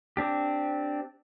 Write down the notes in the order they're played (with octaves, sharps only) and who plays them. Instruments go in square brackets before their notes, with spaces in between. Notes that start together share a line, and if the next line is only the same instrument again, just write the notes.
[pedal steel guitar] C4 D4 G4